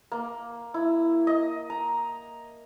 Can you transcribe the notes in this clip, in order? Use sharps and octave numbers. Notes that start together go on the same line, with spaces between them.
A#3
E4
D#5
A#5